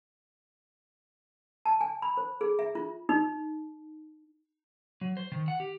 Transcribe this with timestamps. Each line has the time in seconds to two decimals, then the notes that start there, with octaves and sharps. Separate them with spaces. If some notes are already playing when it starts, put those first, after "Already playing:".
1.66 A5
1.81 G#5
2.02 B5
2.17 C5
2.41 G#4
2.59 E5
2.75 F4
3.09 D#4
5.01 F#3
5.17 C5
5.32 D#3
5.48 F#5
5.60 G4